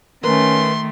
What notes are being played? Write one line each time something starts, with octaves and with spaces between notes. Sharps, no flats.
D#3 A3 C#4 A#4 B4 A#5 C6